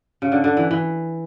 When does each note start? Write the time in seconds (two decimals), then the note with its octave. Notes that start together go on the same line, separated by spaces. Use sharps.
0.22 C#3
0.32 D3
0.44 D3
0.57 E3
0.71 E3